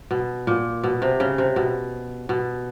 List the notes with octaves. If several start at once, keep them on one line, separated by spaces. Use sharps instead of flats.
B2
A#2
B2
C3
C#3
C3
B2
B2